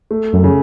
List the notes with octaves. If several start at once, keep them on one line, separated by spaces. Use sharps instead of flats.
A3
F#2
C#3